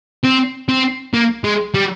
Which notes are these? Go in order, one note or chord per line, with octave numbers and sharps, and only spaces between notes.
C4
C4
A#3
G#3
G3